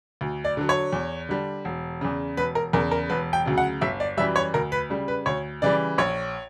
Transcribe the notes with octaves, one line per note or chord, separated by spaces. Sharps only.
D2
D5
D3 F#3
C#5
E2
D3 G3
E1
E2 C#3
E1 B4
A#4
E2 C#3 A#4
A#4
E1 B4
G5
D2 C#3 F#3
F#5
G1 E5
D5
F#2 E3 G3 E5
C#5
D2 A#4
B4
C#3 G3
B4
D2 C#5
C#3 E3 G3 D5
A#1 C#5